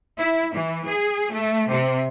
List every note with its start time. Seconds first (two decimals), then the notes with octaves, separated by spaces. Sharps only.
0.19 E4
0.54 E3
0.86 G#4
1.31 A3
1.69 C3